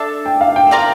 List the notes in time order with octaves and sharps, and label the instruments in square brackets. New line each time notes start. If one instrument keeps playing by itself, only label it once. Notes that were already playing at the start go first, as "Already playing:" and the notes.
Already playing: [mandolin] D4 A4 E5 A5
[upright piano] G5
F5
G5
[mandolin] F4 A#4 D5